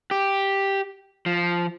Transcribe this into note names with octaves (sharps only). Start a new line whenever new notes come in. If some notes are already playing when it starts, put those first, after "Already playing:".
G4
F3